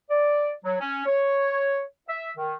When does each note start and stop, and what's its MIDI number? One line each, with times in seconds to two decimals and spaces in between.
0.10 0.51 74
0.63 0.76 54
0.79 1.05 61
1.06 1.83 73
2.08 2.31 76
2.37 2.55 51